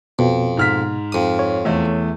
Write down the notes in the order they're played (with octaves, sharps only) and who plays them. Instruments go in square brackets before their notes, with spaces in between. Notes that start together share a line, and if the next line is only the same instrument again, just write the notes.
[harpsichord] F2 [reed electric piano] B2
[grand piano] G#2 F6 B6
[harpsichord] F2 D#6
[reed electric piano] C#5
[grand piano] E2 A3